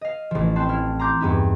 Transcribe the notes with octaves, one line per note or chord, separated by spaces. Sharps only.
D#5 F5
A1 F3
C4 A5 C6 F#6
E4 F6
A#5 C6 D6 G6
E2 G2 G3 B3 D#4 E4